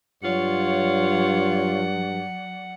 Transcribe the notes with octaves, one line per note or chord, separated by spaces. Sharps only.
G2 F#3 F4 C#5 D5 F#5